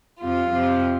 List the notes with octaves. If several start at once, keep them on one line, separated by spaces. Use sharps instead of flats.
F2 C3 F3 F4
F2 C3 F3